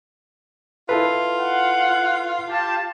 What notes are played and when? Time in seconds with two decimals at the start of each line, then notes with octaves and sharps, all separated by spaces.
0.89 E4 F4 A4 B4
1.39 F#5
2.49 G4 A5